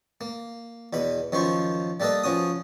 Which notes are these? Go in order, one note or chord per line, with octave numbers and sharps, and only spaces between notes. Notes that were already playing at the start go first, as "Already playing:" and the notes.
A#3
E2 B2 B5
F#2 D#3 F3 C5 C#6
G3 A#3 A4 B4 D#5
F3 C#4 F#4 D#6